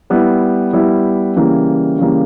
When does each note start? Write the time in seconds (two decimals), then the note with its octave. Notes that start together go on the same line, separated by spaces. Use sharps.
0.10 G3 B3 E4
0.73 G3 B3 E4
1.36 C#3 E3 G3 A#3
1.99 C#3 E3 G3 A#3